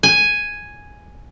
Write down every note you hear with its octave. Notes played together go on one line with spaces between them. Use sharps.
G#5